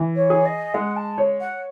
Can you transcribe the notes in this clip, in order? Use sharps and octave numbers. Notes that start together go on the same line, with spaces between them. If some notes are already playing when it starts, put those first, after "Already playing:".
Already playing: E3
C#5
G#4
D#5
G#3 F#5
A5
C#5
F#5